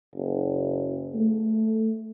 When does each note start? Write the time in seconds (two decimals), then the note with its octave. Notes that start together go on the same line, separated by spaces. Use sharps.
0.15 F#1
1.14 A3